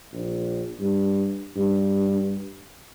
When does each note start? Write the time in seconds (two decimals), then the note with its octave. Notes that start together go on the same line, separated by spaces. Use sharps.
0.12 A#1
0.80 G2
1.56 G2